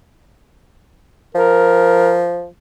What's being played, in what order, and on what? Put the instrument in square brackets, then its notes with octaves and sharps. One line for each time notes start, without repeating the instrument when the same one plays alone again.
[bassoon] F3 [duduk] A#4